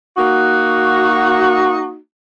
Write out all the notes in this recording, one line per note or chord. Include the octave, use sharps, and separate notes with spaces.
A#3 D#4 F#4